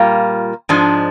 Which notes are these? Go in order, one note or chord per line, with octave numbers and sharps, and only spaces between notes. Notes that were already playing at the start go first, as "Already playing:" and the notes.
Already playing: A#2 G3 A#3 F4
G#2 F3 G#3 D4